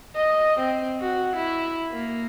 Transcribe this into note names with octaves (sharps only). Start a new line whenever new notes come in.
D#5
C4
F#4
E4
A#3